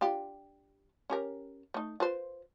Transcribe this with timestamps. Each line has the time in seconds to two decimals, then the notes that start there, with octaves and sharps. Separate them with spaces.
0.01 D4 F4 G4
1.10 C#4 G4 A#4
1.74 A3 D#4
2.00 F4 B4 C5